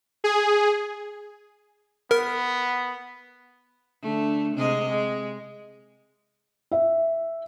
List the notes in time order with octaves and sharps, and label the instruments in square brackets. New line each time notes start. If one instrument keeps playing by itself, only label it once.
[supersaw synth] G#4
[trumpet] B3 [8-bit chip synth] A#4
[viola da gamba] D3 A3
C3 G#3 D#5
G#3
[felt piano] E5